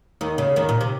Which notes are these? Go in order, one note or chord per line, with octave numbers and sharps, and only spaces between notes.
D#2 D#3
C#3
D#2 D#3
A#2
C3